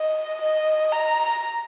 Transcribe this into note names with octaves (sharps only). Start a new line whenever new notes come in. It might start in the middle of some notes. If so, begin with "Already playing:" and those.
Already playing: D#5
D#5
A#5